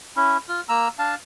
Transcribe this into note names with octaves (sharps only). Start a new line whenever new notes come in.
C#4 E4
F4
A#3 A#5 E6
D4 F5 A5